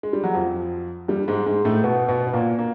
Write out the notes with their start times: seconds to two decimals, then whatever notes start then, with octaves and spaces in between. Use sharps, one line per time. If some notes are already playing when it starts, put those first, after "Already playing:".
0.03 G#3
0.13 G3
0.24 F#3
0.34 F2 F3
1.08 G2 G3
1.28 G#2 G#3
1.46 G#2 G#3
1.65 A2 A3
1.84 B2 B3
2.08 B2 B3
2.27 B3
2.33 A#2 A#3
2.59 A#3